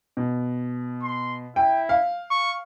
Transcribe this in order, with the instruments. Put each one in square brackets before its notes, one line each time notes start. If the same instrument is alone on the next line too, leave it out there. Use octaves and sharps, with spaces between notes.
[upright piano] B2
[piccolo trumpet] C6
[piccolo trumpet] E4 [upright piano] G5
[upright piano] F5
[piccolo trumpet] C#6